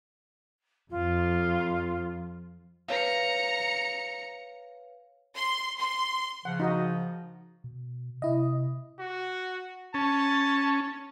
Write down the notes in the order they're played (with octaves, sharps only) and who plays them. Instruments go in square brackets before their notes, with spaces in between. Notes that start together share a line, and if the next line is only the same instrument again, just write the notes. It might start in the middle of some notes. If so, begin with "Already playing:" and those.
[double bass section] F2 [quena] F4
[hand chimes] B4 C#5 F5 [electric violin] A#5 C#7
[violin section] C6
C6
[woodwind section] C#3 F3 [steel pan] F#5
[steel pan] D#4 F#4 D#5
[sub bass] B2
[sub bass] C3 [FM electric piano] E4 D#5
[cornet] F#4
[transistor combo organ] C#4 [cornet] A5